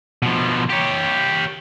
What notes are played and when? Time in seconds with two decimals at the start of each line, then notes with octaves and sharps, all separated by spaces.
0.23 B2 F3
0.69 G4 C#5